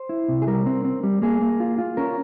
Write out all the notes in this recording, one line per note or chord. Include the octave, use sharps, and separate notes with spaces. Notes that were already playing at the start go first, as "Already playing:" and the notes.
Already playing: C5
E4
C3
G#4
G3 A#4
C4
C4
G3
A#3 G#4
A#3
F4
F4
C#4 A#4